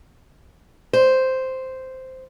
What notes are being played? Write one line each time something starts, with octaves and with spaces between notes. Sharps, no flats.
C5